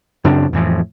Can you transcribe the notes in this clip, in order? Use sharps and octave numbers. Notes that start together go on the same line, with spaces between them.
F#2 C#3 C4 D4
F2 A2 E3 F3